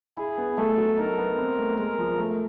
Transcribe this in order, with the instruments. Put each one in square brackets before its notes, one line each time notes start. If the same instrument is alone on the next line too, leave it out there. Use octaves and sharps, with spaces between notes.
[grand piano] E4 [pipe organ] G#4
[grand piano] B3
[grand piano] A3 [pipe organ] A4
[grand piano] F#3
[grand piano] D#4 [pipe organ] A#4
[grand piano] B3
C4
A3
[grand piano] G#3 [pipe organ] A#4
[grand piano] F3
A3